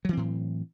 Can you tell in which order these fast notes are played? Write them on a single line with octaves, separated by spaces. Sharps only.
F#3 E3 C4 A2